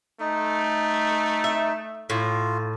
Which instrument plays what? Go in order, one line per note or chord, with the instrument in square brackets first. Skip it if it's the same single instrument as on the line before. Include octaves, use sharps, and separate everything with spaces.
[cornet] A3 [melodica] D#4
[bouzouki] E5
[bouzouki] A2 [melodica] F4